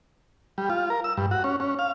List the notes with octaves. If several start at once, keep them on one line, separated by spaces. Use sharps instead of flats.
G3
F4
A#4
E6
G2
F#4
C#4
C#4
F5